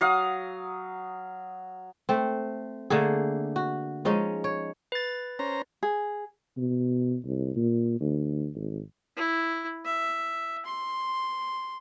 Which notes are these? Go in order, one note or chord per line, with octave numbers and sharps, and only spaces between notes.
F#3 F5 D#6
A3 C4
D3 A3 A#3 G#4
F#4
F3 G#3 C#4 D#4
C#5
B4 A6
C#4 C5 A#5
G#4
B2
C2
A#2
D2
G#1
E4
E5
C6